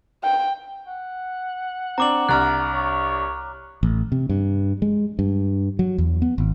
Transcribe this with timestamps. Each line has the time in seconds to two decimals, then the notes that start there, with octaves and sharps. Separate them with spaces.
0.23 G5
0.87 F#5
1.98 C4 D4 A#5 D6 F#7
2.29 C2 D4 A#5 F6 F#6
2.72 C#5
3.83 A1
4.12 C3
4.29 G2
4.82 G#3
5.19 G2
5.79 F#3
5.98 E2
6.22 B3
6.38 G#1